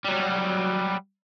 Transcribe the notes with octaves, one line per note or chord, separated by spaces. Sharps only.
F#3 G3